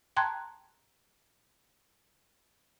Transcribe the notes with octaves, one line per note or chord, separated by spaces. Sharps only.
G5 A5 A#5 C6 F#6 G#6